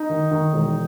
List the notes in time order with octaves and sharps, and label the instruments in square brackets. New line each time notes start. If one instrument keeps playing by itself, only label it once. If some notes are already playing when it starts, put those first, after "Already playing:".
Already playing: [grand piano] D#4
[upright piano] D#3
D#3
E1